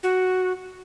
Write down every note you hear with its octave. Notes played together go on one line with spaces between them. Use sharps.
F#4